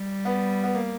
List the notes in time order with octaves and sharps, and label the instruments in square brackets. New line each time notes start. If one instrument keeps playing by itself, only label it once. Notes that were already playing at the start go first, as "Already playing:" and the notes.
Already playing: [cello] G3
[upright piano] B3
B3
A#3